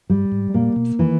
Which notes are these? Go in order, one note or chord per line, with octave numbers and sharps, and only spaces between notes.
G2 G3
G#2
A#2 A#3
B2
D#3 E3